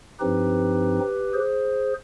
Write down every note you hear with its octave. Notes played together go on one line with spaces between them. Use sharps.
G2 F3 C4 D#4 G4 B4
G#4 C5